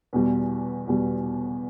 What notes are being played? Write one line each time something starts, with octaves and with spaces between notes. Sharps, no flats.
E2 B2 G3
E2 B2 G3